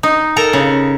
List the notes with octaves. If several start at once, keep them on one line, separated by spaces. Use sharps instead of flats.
D#4
A4 A#4 A#5
C#3